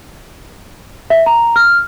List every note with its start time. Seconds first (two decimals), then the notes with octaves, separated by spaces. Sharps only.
1.10 E5
1.26 A#5
1.56 F6